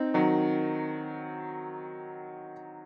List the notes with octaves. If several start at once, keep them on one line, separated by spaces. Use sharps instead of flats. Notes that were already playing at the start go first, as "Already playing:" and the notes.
Already playing: C4 D#4
D#3 F#3